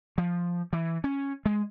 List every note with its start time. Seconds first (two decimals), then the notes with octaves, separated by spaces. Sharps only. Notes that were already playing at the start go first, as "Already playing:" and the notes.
0.18 F3
0.73 E3
1.04 C#4
1.46 G#3